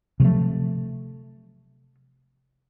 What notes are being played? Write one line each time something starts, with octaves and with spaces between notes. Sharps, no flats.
C3 F3 F#3 A3